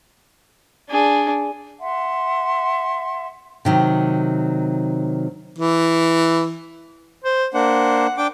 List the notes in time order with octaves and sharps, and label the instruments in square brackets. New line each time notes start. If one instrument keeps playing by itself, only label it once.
[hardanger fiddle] D4 G#4
[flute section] E5 F#5 C6
[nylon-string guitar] C3 D#3 F#3
[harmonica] E3
[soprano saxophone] C5
[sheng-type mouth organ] A#3 D4 C5 [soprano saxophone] F#5
[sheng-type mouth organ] D4 G5 D6